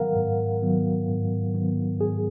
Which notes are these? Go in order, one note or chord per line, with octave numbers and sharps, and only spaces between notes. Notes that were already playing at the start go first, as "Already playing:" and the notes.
Already playing: G#2 D#3 F#3 B3 A#4 F5 F#5
G#2
D#3 F#3 B3
G#2
D#3 F#3 B3
G#2 G#4